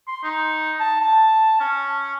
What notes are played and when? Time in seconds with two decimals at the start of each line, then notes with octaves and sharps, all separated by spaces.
0.08 C6
0.24 D#4
0.80 A5
1.01 A5
1.60 C#4